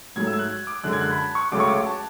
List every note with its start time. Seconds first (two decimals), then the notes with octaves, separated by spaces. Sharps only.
0.16 G#2 F#3 A3 G#6
0.27 E6
0.33 G#6
0.39 F#6
0.67 D6
0.84 F#2 D3 G#3 F#6
0.93 G#6
1.01 F#6
1.10 B5
1.18 A5
1.35 C#6
1.52 C#2 C#3 F#3 A3 D6
1.60 C#6
1.68 D6
1.86 A5